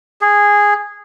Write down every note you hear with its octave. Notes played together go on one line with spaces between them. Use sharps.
G#4